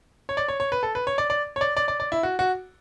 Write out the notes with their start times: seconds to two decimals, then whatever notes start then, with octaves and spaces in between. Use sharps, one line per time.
0.29 C#5
0.37 D5
0.48 C#5
0.60 C#5
0.72 B4
0.83 A4
0.95 B4
1.07 C#5
1.18 D5
1.30 D5
1.56 C#5
1.61 D5
1.77 D5
1.88 D5
2.00 D5
2.12 E4
2.23 F#4
2.39 F#4